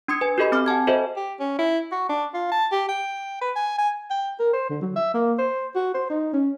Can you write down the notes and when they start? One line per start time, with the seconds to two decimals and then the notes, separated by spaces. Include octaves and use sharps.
0.08 D4 C6 D#6 G#6 C#7
0.21 B4 G#5
0.38 F#4 G4 A4 D#5 B5
0.52 C4 B5 D6 F6
0.66 F#5 G#5 A5 G#6
0.87 F#4 A4 C5 D#5 E5
1.16 G4
1.40 C#4
1.59 E4
1.92 F#4
2.09 D4
2.34 F4
2.52 A5
2.72 G4
2.89 G5
3.42 B4
3.56 G#5
3.78 G#5
4.10 G5
4.39 A#4
4.53 C5
4.70 D3
4.82 F#3
4.96 E5
5.14 A#3
5.39 C5
5.76 F#4
5.94 C5
6.10 D#4
6.33 C#4